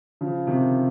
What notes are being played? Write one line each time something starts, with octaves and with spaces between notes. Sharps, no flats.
C#3 F3
C3 D#3